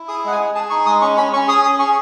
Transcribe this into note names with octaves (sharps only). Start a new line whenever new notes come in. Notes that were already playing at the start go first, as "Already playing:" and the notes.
Already playing: E4
G#4 D#6
G#3 F#5
G#5
G#4
G#4 A5
D#4 C#6
G#3 D#6
C#4 C#6
C#4 B5
C#4 C#6
G#4 D#6
C#4 D#6
G#4 C#6